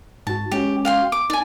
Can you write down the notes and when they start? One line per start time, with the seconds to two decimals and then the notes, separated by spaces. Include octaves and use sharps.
0.27 G#2 F#4 A5
0.52 G#3 C#4 F#4 G4
0.85 F5 G5 C6
1.12 D6
1.30 D#4 D5 G#5